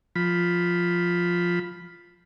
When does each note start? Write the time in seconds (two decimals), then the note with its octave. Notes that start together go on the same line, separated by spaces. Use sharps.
0.16 F3 B5